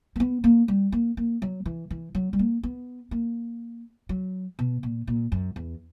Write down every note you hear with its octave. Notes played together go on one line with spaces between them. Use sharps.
A#3
B3
A#3
G3
A#3
A#3
F#3
E3
E3
F#3
G3
A#3
B3
A#3
F#3
B2
A#2
A#2
F#2
E2